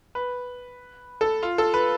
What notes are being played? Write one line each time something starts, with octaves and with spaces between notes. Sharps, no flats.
B4
A4
F4
A4
B4